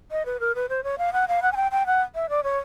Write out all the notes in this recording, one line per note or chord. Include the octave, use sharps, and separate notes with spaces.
D#5
B4
A#4
B4
C5
C#5
F5
F#5
F5
F#5
G#5
G5
G5
F#5
E5
D5
C#5